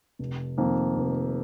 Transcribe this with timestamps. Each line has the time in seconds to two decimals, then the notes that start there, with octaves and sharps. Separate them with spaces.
0.19 F1
0.58 F2 D#3 A#3
0.96 F1